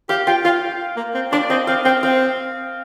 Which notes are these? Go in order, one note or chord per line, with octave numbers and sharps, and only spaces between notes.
G4 F5
F4 G5
F4 F5
A#3
C4
D4 D5
C4 D#5
C4 F5
C4 G5
C4 F5